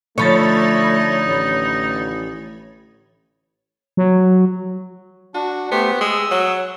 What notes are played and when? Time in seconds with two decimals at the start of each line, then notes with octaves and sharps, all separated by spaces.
0.18 D3 F3 A3 D#4 C#5 B5 A6
1.25 A1
3.97 F#3
5.35 D4 F#4
5.71 A3 B3 G4 C5
6.01 G#3 D#6 E6
6.31 F#3